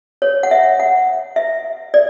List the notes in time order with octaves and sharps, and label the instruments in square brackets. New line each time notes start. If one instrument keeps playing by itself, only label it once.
[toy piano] C#5
F#5
E5
F#5
E5
D5